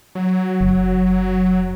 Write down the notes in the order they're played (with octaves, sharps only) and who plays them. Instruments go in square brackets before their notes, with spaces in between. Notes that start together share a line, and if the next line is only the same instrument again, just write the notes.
[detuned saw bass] F#3
[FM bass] F#1